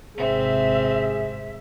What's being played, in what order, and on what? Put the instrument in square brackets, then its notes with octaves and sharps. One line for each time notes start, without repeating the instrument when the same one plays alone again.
[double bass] G#1 C3 [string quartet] C4 [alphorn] G#4 [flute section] E5